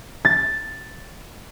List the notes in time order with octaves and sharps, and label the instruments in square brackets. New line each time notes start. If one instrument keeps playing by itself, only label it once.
[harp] A6